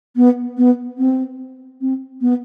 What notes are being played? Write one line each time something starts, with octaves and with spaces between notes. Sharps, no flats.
B3
B3
C4
C4
B3